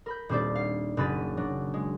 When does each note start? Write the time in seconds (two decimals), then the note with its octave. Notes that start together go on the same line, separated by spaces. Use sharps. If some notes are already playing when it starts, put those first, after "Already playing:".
0.06 A#4 B5 G6
0.29 D#1 G3 C4 D4 G4 D5
0.55 F5
0.97 F#1 C#3 F#3 B5 A6 D#7
1.37 F#3 D4
1.74 G#3